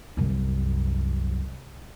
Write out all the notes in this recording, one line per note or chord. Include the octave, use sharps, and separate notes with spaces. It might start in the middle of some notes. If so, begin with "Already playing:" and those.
C2 F#2